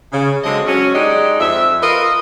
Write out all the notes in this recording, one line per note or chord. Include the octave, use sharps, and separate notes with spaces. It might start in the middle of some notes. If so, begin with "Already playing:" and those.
C#3
D3 F#3 G#3 C4 D#5
F#3 C#4
G#3 D4 D#4 G4 G#4
F2 E5
F4 A#4 B4 D#5